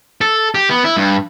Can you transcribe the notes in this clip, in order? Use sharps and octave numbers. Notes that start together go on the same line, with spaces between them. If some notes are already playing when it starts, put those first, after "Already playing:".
A4
G4
B3
E4
G2